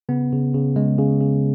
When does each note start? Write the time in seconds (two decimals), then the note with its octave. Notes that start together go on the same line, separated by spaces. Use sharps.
0.09 C#3 B3
0.32 C#3
0.54 C#3
0.76 C#3 G#3
0.99 C#3
1.21 C#3